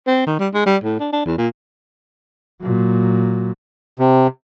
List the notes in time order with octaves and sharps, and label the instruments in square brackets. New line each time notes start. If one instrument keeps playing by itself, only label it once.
[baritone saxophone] C4
D#3
G3
G#3
G3
A2
D4
D4
E2
A#2
[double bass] A#2 F#3
[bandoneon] C3